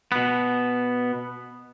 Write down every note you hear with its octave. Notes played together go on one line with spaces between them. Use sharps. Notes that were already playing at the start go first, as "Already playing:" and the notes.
B2 B3